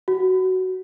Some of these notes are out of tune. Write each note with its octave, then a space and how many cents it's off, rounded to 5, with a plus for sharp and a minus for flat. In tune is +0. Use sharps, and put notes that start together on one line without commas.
F#4 +10